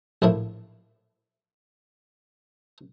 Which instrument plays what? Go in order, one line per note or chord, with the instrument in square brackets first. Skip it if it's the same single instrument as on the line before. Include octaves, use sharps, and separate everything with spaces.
[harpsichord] A#1 A2 F3 A#3 E4